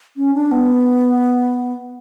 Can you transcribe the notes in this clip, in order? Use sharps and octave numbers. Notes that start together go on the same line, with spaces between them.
C#4
D4
B3